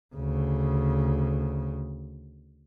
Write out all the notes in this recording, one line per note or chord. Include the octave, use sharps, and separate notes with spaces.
D2 C#3